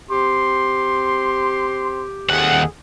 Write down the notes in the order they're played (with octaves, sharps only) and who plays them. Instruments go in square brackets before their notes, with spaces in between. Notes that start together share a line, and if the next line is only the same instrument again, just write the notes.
[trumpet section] C4 C6 [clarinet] G4
[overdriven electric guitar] D#2 F#5 [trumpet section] C4 G#4 A4